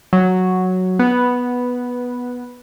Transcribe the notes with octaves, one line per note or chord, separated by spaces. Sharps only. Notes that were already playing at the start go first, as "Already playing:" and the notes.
F#3
B3